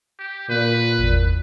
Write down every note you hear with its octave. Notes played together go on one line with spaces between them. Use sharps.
G4
A#2 B4
G#1 E2